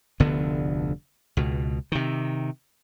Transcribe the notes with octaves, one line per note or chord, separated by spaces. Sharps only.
F1 D2 D3 B3
C#2 B2
C3 D#3